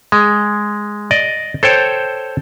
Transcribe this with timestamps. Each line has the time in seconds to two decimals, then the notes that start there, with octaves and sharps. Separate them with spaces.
0.12 G#3
1.11 D5 D#5
1.63 A4 C5 C#5 G5